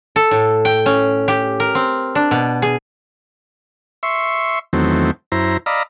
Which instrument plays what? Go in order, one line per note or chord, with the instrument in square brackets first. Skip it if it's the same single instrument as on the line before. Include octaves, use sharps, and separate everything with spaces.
[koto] A4
A2
G5
C#4
G4
A#4
C4
D4
B2
G#4
[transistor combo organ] E5 C6 C#6
E2 D#3 F#3 A3 C4
F#2 E4 C5 A#5
D5 D#5 F5 A#5 B5 E6